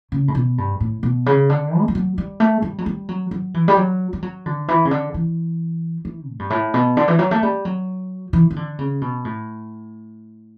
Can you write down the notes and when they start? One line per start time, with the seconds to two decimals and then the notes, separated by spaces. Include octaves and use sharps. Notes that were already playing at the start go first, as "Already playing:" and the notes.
0.12 C#3
0.28 A2
0.35 B2
0.58 G2
0.80 A2
1.03 B2
1.26 C#3
1.49 D3
1.80 A3
1.88 G3
1.95 F#3
2.18 G3
2.40 A3
2.62 G3
2.78 F#3
2.86 G3
3.09 F#3
3.31 F#3
3.54 E3
3.68 G3
3.77 F#3
4.13 G3
4.22 F#3
4.46 D3
4.68 E3
4.85 C#3
4.91 D3
5.14 E3
6.05 E3
6.28 A2
6.39 G2
6.50 A2
6.74 B2
6.97 D3
7.08 E3
7.19 F#3
7.31 A3
7.43 G3
7.65 F#3
8.33 E3
8.50 E3
8.56 D3
8.79 C#3
9.01 B2
9.25 A2